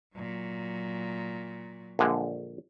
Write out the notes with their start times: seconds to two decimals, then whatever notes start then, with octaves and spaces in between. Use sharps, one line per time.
0.15 A#2 F#3
1.99 A#1 D3 G#3